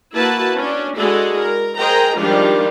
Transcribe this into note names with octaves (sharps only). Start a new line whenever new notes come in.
A#3 E4 F#4 B4 A5
C#4 D4
G#3 D4 E4 F#4 G#4 A4
A#4
G#4 A#4 C5 D#5 G5 A#5
D#3 F3 G3 G#3 D4 F4